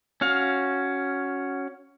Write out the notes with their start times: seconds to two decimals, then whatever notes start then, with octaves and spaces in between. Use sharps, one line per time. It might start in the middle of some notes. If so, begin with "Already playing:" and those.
0.21 C#4 F#4 F5